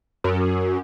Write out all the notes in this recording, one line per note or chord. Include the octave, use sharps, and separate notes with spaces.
F#2